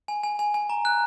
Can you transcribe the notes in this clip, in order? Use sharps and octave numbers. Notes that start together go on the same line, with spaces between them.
G#5
G#5
G#5
G#5
A#5
F#6